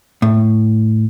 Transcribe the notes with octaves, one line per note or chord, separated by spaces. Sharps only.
A2